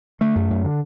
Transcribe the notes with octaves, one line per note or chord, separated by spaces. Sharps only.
D3 A3
F#2
F#2
D3